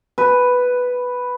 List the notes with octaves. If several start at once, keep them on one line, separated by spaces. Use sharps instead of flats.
B4